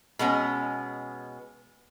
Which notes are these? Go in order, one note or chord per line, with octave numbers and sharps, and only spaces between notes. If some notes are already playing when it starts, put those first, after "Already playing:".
B2 G#3 B3 C#4